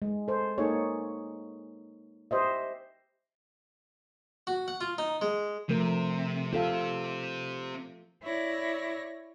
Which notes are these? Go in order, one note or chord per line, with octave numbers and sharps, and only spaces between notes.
G#3
A4 C5
A#3 D#4 G#4 A4 C#5
G4 C5 D#5 E5
F#4
F#5
F4
D#4
G#3
C3 F3 A3 A#4
C4 F4 G4 A4 F5
E4 C#5 D5 A#6